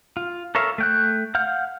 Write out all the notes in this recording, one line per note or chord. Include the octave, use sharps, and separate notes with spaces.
F4
A4 A#4 C#5 E5 F5
A3 G5 F#6
F5 F#5 F6 G6